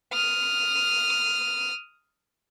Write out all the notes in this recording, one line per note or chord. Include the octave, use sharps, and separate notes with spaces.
D#6 F6